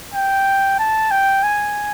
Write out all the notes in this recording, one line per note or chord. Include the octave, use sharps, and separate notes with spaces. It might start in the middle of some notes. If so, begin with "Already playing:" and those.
G5
A5
G5
G#5